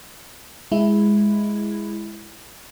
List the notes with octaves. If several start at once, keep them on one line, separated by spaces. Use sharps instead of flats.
G#3 E4